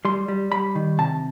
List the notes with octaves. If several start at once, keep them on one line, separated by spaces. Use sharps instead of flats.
G3 C6
G3
G3 B5
D#3
C3 A5